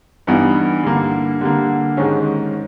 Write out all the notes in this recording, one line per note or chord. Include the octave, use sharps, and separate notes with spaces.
G2 E3 G3 B3 D#4
D3 G3 A#3
D3 G3 A#3
G#2 D#3 G#3 C#4